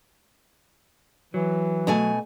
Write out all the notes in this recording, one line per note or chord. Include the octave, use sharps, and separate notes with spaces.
E3 F#3
B2 A3 G#5